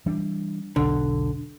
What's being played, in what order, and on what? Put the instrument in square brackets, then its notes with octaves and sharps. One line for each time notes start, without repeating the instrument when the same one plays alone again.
[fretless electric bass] E3 G3 D4
[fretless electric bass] E1 B1 [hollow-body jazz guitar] D3